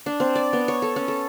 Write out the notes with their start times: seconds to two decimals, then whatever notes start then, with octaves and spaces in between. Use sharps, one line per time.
0.06 D4
0.20 C4
0.35 D5
0.53 B3
0.68 C#5
0.82 A4
0.96 C#4
1.08 A4